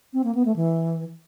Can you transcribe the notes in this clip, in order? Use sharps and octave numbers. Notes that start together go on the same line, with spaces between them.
C4
A#3
B3
A3
E3